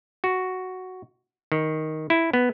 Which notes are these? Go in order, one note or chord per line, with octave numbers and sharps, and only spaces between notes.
F#4
D#3
E4
B3